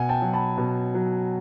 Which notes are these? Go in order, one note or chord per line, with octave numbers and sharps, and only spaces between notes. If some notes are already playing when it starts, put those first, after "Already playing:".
Already playing: B2 F#5 G#5
G5 A5
F#3
A5 B5
B2
F#3